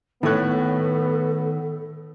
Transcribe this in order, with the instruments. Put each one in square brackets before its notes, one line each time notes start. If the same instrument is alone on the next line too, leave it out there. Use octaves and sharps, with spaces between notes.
[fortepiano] A2 A3 F#6 [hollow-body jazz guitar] D#3 C#5 [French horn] B3 [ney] A4